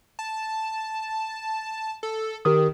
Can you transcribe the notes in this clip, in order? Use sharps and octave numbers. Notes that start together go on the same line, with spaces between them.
A5
A4
D#3 G4 A#4 D#6